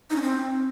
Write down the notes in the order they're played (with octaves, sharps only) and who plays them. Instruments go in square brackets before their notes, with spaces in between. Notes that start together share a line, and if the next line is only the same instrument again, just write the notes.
[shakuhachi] D#4
C#4
C4